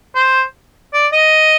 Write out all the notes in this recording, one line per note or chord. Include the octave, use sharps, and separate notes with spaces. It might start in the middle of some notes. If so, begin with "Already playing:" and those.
C5
D5
D#5